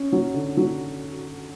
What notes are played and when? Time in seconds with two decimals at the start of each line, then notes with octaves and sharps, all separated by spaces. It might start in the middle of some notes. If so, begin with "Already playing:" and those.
Already playing: C#4
0.12 F#3
0.34 D3
0.57 F#3